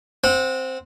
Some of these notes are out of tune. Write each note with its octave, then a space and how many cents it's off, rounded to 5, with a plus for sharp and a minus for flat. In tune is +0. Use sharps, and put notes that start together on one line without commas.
C4 +0 F#5 -30